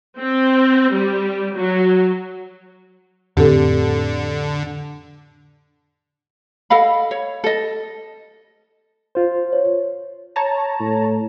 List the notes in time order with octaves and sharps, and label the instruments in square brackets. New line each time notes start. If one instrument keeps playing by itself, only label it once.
[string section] C4
G3
F#3
[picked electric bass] F2 A2 C4 [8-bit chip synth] D3 [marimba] G4 A4
[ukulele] A4 D#5 F5 B5
C#5
A4 D#5
[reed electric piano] F4 C5
[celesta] C#5
[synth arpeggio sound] C#5 A5 A#5
[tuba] A2